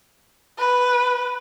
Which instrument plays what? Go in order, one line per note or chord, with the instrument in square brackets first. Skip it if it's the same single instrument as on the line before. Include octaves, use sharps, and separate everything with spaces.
[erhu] B4